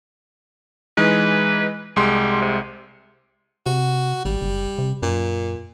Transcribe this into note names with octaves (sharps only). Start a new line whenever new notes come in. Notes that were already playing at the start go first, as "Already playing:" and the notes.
E3 G#3 D#4 B4
C2 G3 G#3 C6
C3
C3 F#4
G#1 G3
F#1
C3
F#2 A#2